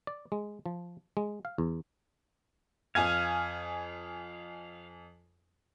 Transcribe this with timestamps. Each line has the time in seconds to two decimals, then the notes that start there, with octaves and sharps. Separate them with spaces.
0.07 D5
0.32 G#3
0.66 F3
1.17 G#3
1.45 F5
1.58 E2
2.95 F2 F5 G#5 G#6